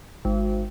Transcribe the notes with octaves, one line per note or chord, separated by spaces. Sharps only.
G#1